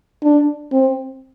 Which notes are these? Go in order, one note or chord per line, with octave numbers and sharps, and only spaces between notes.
D4
C4